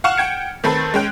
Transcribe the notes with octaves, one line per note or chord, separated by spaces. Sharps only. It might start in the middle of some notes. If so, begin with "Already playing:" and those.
F5 F#5 C#6 F6 E7
F#5 G5 G#6 C#7
D#3 A3 C4 A4 B4
G#3 C#4 G5 F#6